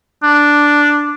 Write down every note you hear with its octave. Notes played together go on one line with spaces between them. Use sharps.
D4